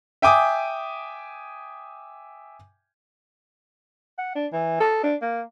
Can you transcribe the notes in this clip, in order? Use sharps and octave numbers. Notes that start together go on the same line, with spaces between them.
E5 G5 G#5 D6 D#6
F#5
D4
E3
A4
D4
A#3